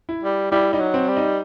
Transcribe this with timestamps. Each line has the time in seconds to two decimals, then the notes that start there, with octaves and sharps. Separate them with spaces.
0.09 E4
0.23 G3
0.51 G3 E4
0.73 G3 D#4
0.79 F#3
0.94 C4
1.08 G3
1.17 D#4